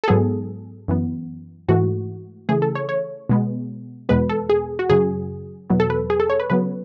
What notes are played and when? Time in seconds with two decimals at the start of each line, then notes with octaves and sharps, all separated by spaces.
0.04 A4
0.08 G#2 F#3 B3 G#4
0.88 F#2 E3 B3
1.69 G#2 E3 A3 F#4
2.49 C#3 E3 A3 G#4
2.62 A4
2.75 C#5
2.89 C#5
3.29 B2 G#3 B3
4.09 E2 B2 G#3 B3 B4
4.29 A4
4.49 G#4
4.79 F#4
4.89 F#2 C#3 F#3 G#4
5.70 E2 B2 F#3 B3
5.80 A4
5.90 B4
6.10 G#4
6.20 A4
6.30 C#5
6.40 B4
6.50 C#3 F#3 B3 B4